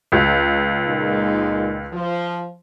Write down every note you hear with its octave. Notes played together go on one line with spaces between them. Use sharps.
C#2
A#2 G#3 D#4
F3